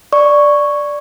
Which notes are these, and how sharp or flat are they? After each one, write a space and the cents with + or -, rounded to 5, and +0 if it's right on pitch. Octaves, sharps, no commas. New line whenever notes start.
D5 +0 C#6 +0